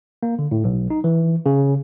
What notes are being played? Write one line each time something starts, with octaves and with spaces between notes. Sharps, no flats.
A#3
D3
A2
B1
D#4
E3
C#3